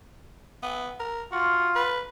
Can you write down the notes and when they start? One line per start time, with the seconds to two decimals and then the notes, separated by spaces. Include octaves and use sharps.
0.63 B3
1.00 A#4
1.32 F4 F#4
1.75 B4